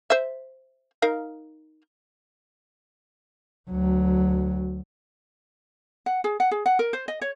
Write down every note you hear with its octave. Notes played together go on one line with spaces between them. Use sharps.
C5 E5
D#4 A#4 F5
D2 F#3
F#5
G#4
F#5
G#4
F#5
A#4
C5
D#5
C#5